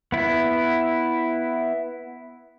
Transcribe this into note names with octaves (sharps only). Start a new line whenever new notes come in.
B3 E4